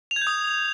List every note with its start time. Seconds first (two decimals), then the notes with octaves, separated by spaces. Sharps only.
0.11 F7
0.16 G#6
0.22 G6
0.27 D#6